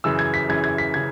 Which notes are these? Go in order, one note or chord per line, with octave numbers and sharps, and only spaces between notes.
F#2 C#3 E3 E6
G#6
B6
F#2 C#3 E3 G#6
G#6
B6
C#3 G#6